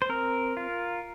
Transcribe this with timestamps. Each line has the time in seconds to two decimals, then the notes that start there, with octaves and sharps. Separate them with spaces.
0.02 C5
0.09 C4 A#4
0.57 F4